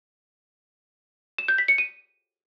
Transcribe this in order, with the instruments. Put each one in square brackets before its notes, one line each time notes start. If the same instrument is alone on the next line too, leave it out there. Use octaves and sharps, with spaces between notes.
[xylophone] E7
G6
B6
C#7
D#7